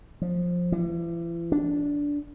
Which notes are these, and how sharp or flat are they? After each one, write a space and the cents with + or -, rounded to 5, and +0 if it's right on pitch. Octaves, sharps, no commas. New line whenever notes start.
F3 +15
E3 +40
D4 -15